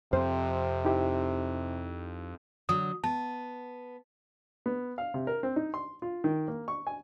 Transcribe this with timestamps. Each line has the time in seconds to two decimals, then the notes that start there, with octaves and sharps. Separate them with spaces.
0.13 F2 C3 C4 C5
0.85 D#4 E4 G4
2.69 D3 F#3 D#6
3.04 B3 A5
4.66 B3
4.98 F5
5.14 C3
5.27 A#4
5.43 C4
5.56 D#4
5.74 C6
6.02 F4
6.24 D#3
6.48 A#3
6.68 C#6
6.87 G#5